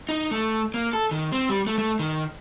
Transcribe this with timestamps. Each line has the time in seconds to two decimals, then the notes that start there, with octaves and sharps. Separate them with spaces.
0.09 D#4
0.31 A3
0.74 A#3
0.93 A4
1.11 D#3
1.32 C4
1.50 G3
1.67 A3
1.78 A3
1.99 D#3